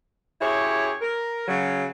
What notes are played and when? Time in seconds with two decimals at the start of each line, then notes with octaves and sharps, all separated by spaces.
0.41 F#2 E4 G4 G#4 C#5
1.01 A#4
1.48 C#3 F#3